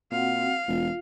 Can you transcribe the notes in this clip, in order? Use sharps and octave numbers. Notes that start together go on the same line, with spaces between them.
A#2 C4 F#4 F5 F#5
E1 F4